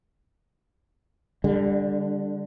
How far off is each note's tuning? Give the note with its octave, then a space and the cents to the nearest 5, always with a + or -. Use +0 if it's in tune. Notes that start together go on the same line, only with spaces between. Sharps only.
D3 +0 G3 +30